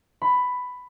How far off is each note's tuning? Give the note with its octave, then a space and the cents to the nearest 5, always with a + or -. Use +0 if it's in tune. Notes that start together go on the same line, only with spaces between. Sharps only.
B5 +10